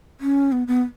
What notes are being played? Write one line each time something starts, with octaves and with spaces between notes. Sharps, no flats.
C#4
B3
B3